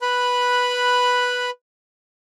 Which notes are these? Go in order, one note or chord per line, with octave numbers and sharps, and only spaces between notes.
B4 B5 F#6